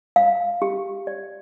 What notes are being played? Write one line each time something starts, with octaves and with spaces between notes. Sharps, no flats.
F5
G4
D5